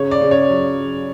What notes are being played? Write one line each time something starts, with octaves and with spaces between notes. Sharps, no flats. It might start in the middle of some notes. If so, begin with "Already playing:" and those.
Already playing: C#3 C#5
D5
C#3
C#5
F#3